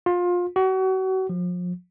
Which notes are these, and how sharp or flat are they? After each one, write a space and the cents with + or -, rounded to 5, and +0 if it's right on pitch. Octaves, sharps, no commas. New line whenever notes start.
F4 +25
F#4 +35
F3 +35